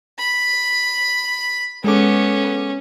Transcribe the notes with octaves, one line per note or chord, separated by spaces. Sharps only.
B5
G#3 B3 C#4 A4 D6